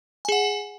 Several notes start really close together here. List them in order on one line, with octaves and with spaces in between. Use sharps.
G#5 G#4 F#5